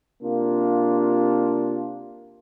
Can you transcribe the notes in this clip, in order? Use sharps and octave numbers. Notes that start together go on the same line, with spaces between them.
C3 A#3 D4 F4